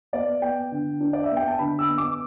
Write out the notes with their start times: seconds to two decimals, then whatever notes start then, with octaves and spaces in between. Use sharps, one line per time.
0.13 B3 D5
0.42 B3 G5
0.72 D3
1.00 D4
1.13 D5
1.24 E5
1.30 B3
1.37 G5
1.48 A5
1.59 D3 B5
1.79 E6
1.88 B3
1.98 D6